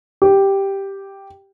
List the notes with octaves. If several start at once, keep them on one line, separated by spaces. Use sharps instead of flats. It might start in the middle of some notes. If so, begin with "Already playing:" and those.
G4